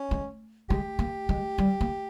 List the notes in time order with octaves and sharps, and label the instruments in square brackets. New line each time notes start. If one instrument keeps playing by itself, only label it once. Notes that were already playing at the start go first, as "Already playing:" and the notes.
Already playing: [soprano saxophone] C#4
[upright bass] G#3
[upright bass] G#3 [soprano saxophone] G4
[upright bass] A#3
G#3
G3
A#3